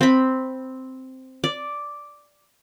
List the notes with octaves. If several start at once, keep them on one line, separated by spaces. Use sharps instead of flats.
C4 B5
D5